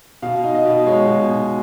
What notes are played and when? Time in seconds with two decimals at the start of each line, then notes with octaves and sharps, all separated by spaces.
0.22 B2 F5
0.44 D#4
0.54 D#5
0.65 B2
0.86 G#3 C#5
1.07 B2
1.30 B2